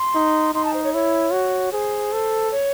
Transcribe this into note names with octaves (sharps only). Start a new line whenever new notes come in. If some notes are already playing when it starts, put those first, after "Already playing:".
Already playing: C6
D#4
D#4 C6
A5
C5
C#5
E4 C#5
F#4
G#4 C5
A4
C#5